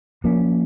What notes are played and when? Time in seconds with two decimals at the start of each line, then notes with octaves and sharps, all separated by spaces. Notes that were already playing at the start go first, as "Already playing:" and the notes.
0.24 F3 A#3 C#4